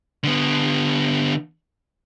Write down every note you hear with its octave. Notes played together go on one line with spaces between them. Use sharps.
D3 B3